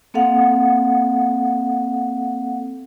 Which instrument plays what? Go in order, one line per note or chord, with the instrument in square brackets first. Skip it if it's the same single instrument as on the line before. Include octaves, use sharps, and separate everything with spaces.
[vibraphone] A#3 C4 A4 F5 F#5